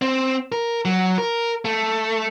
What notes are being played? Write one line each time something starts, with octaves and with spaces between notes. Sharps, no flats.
C4
A#4
F#3
A#4
A3